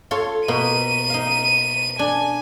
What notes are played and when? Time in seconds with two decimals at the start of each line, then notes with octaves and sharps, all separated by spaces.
0.11 F4 A4 C#5
0.48 B2 A#3 D#7
1.10 D#4 F5
1.99 D4 G#5